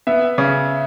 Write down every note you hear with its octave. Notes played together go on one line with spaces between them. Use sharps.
B3 E5
C#3